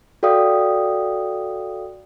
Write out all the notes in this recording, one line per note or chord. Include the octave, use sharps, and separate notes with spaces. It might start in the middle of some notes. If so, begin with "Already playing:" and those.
F#4 A4 D5 F5 G5 D#6